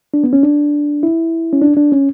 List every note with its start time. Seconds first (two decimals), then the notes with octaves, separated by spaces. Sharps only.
0.14 D4
0.24 B3
0.33 C#4
0.43 D4
1.03 E4
1.53 C#4
1.62 D4
1.77 D4
1.92 C#4